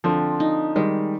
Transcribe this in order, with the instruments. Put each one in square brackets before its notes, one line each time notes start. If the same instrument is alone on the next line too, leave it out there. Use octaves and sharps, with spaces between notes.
[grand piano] D3 F3 [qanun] C4
[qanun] D#4
[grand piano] D#3 G3 [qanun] G#3